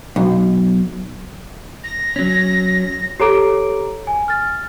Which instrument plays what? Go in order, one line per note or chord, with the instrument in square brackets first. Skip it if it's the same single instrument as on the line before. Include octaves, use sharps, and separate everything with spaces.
[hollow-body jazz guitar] B1
[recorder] A#6
[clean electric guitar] F#3 C#4
[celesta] G4 A4 C#5 A#5 D6 D7
G#5
F6 A6